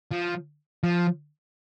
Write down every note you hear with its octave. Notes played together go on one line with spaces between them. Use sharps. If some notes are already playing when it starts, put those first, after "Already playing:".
F3
F3